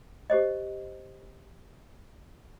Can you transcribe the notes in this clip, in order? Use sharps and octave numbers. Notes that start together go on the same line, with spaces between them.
G4 C5 D#5